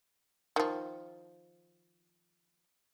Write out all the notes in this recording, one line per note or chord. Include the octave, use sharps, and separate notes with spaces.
D#3 F3